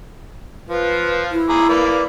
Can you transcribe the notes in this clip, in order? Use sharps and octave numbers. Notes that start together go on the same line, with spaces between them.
F3 F4 B4
E4
G#4 A#5 D6
A#3 B4 D5